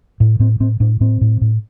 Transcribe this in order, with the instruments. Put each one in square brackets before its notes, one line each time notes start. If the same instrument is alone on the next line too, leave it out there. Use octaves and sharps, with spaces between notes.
[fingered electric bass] A2
A2 C4
A2 C4
A2 D4
A2 C4
A2
A2